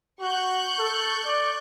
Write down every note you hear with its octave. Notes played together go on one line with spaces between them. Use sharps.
F#4 C#6 F#6 G6
A4
D5